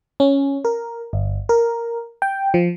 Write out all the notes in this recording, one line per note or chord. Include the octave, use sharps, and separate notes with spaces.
C#4
A#4
G1
A#4
G5
F3